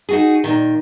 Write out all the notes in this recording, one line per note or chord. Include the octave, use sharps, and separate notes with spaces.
D#4 F#4 G#4
A#2 D#3